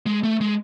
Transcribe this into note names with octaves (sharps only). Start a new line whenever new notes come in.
G#3
A3
G#3